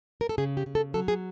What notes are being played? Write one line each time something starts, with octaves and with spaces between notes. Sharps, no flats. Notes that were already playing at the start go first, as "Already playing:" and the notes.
A#4
A4
C#3 G#4
G4
C#3
A4
F#3 A4
G#4